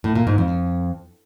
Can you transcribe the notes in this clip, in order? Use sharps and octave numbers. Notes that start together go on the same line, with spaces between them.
A2
A#2
G#2
F2